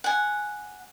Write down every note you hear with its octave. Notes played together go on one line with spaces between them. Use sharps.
F#5 G#5